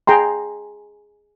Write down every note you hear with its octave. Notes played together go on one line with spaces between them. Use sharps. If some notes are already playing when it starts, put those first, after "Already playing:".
G#4 G5 A#5 C6